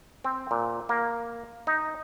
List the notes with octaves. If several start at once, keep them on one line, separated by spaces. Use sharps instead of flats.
C4
A#2
A#3
D#4